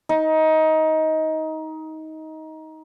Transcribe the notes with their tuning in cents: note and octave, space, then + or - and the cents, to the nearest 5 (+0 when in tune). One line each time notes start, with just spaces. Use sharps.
D#4 +20